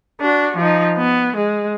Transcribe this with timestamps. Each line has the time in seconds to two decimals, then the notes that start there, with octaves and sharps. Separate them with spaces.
0.21 D4 F#4
0.57 F3 D#4
0.97 B3
1.37 G#3